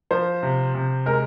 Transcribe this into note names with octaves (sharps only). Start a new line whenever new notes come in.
F3 C5
C3
C3
G#3 A#4